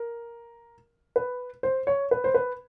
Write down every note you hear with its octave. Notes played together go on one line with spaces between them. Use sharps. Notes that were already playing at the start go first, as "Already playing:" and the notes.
Already playing: A#4
B4
C5
C#5
B4
C5
B4